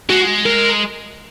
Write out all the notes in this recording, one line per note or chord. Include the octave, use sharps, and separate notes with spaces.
G#3 F#4
A#4